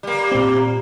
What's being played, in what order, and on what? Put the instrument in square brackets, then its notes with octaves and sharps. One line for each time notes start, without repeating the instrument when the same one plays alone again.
[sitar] G3 A#3
[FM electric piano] A#2 C4